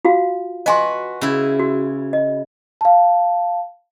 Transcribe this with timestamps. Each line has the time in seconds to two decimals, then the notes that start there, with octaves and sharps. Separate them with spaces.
0.05 F4 F#4 F5
0.66 F#4 B4 D#5 G#5 C6
1.21 C#3 E4
1.59 F#4
2.13 D#5
2.81 F5 A5